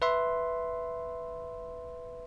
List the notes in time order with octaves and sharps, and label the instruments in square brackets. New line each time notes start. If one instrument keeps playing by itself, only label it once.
[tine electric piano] B4 E5 C6